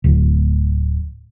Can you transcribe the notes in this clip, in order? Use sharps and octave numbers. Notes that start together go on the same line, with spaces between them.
D1